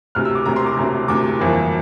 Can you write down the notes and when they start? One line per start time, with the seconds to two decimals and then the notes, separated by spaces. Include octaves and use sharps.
0.15 E1 D2 C3 F6
0.25 E6
0.35 D6
0.45 E1 D2 C3 A#5
0.56 C6
0.66 D6
0.77 E1 D2 C3
1.08 E1 D2 C3 D6
1.39 G1 F2 E3 A#3